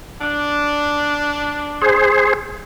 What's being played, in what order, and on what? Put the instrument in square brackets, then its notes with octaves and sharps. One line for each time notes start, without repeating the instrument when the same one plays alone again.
[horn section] D4
[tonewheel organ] G#4 C5